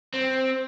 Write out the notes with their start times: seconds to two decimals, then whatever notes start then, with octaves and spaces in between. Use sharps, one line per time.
0.14 C4